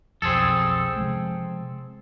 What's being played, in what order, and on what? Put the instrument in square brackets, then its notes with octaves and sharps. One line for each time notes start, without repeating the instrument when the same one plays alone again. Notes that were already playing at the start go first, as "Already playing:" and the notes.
[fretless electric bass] B1 F2 [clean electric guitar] C4 G#4 A4
[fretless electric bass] C3 F3 G#3